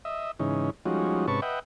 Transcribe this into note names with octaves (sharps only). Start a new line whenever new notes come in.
D#5 E5
G#2 C#3 E3 C#4 D#4
F3 G3 G#3 C#4 D#4 F#4
G#2 C3 C#4 B4 A5 C#6
B4 D#5 E5 F#5 G5